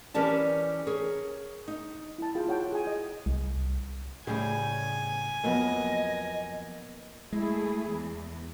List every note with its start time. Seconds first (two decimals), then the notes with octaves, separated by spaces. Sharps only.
0.14 E3 C#4 G4 A#4 D5 A5
0.87 G#4 A#4 C#5
1.68 D#4
2.18 E4 A5
2.35 F4 G#4 G5
2.47 E4 F#4 C#5 F#5 G5 A5
2.72 G#4 G#5
2.87 D#5
3.26 C2
4.27 A2 C#3 G3 G#4 G#5
5.44 F2 F#3 A#3 B3 D#5
7.32 G#3 A3 E4 G#4
7.87 E2